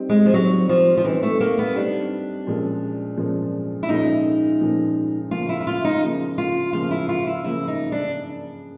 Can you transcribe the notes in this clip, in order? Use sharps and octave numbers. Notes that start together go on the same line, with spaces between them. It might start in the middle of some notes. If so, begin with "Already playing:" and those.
Already playing: G3 C4 D#4 G4
G#3
F3
F#3 G3 C4 D#4 G4
F3
F3
E3 G3 C4 D#4 G4
A3
A#3
B3
G3 C4 D4 D#4 G4
A#2 F3 G#3 C#4
A#2 F3 G#3 C#4
E4
A#2 F3 G#3 C#4 D#4
A#2 F3 G#3 C#4
C#3 F3 A#3 F4
E4
E4
F4
D#4
C#3 F3 A#3
F4
C#3 F3 A#3 F4
E4
F4
E4
C#3 F3 A#3 E4
D#4
D4